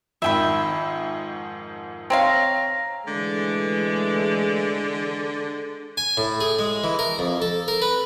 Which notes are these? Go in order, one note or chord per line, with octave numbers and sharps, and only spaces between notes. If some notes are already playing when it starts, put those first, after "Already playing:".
F2 G#2 D#3 E5 G5 B5
C4 C#5 F5 A#5
D3 E3 G#3 A3
G#5
A2
G#4
G#3
E3
A#4
F2
A4
A#4
B4